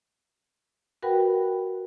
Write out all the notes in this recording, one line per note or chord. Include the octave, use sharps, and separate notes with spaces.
F#4 A#4 B4 F#5 G5 B5